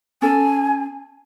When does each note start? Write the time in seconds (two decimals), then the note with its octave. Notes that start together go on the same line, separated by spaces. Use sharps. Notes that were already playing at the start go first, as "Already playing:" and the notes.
0.22 C#4 A4 G#5